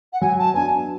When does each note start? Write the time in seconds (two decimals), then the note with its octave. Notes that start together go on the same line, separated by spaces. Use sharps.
0.13 F#5
0.21 F#3 G#5
0.39 A5
0.54 B3 D4 F#4 G#5